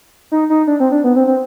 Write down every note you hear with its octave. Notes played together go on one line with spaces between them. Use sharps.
D#4
D#4
D4
C4
D4
B3
C4
C4